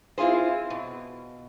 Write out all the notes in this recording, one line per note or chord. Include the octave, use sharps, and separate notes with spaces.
C4 E4 F4 G#4 C5
B2